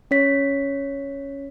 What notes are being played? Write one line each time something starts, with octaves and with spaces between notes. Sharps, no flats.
C#4 C#5 B6